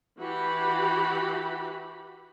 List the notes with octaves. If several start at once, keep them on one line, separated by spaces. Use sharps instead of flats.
E3 F#4 G4 B5